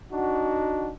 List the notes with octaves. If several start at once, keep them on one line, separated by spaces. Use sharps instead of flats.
D4 D#4 F#4